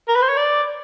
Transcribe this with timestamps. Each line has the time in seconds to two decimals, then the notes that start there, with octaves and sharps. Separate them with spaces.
0.09 A#4
0.16 B4
0.22 C5
0.29 C#5
0.37 D5